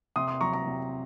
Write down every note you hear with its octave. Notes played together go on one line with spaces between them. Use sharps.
C3 C6 D#6
C6 D#6
F#3 A#5 C#6
A#5 C#6
C3